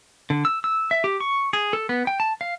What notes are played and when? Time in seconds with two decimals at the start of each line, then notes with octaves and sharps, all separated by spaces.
0.30 D3
0.45 E6
0.64 E6
0.91 E5
1.04 G4
1.20 C#6
1.53 G#4
1.73 A4
1.89 B3
2.07 G5
2.20 A5
2.41 F5